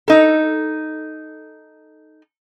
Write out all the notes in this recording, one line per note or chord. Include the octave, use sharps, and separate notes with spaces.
D#4 A4